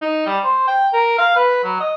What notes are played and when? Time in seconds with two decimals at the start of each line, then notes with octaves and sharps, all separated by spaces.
0.02 D#4
0.26 G3
0.44 C5
0.68 G5
0.93 A#4
1.18 F5
1.36 B4
1.64 F#3
1.80 D#5